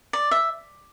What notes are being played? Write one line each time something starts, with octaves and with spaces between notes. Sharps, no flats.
D5
E5